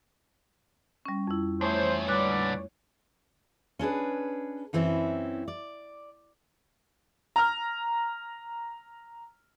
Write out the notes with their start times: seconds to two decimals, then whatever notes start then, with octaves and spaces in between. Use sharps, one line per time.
1.06 G3 C#4
1.27 F2 E4
1.61 E2 A3 E4 C5 C#5
2.08 A#2 D3 G3 B4 D5 F#6
3.79 C#4 D4 G#4 B4
4.73 F#2 E3 C4 C#4 E4
5.48 D5
7.36 A#5 F6